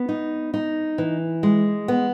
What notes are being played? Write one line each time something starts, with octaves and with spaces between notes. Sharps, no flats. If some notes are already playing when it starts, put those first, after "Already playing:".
Already playing: B3
D#4
D#4
E3
G#3
B3